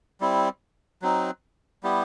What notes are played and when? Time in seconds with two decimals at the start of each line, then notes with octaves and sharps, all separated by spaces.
0.21 G3 C4 E4
1.02 F#3 C4 D#4
1.83 G3 B3 E4 G4